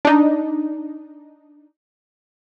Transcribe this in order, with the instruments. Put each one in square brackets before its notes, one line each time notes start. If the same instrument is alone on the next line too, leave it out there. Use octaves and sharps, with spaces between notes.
[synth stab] D4 D#4